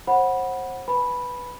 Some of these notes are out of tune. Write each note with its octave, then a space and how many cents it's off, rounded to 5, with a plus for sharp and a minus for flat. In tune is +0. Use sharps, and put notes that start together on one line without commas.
C5 +30 F#5 +0 B5 -10
B4 +0 G#5 +25 B5 -5